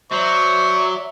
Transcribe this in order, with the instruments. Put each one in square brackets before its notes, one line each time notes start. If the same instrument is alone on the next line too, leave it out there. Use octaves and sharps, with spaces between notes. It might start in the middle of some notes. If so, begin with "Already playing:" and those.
[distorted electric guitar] F#3 [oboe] C5 [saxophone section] D5 E5 [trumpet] C#6